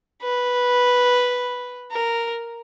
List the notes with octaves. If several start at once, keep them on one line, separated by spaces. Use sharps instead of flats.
B4
A#4